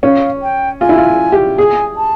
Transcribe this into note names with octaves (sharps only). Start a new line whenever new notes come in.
C#4 F5
G5
F4 G#5
E4
F4
G4
G#4 G#5
A5